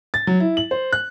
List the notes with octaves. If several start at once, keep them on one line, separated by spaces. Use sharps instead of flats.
A6
F#3
E4
F#7
C5
F#6